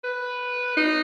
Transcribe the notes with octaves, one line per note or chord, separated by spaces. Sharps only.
B4
D#4